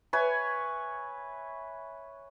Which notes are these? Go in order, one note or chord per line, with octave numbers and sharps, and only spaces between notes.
B4 C#5 E5 G#5